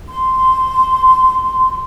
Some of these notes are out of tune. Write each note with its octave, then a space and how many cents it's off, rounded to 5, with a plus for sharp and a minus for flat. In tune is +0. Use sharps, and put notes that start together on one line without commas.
C6 -10